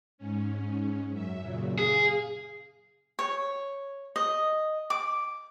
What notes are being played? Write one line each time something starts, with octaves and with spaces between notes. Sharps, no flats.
G#2 C#4
F#2 E5
A#2 C#3 F#3
G#4 F5
C#5
D#5
D6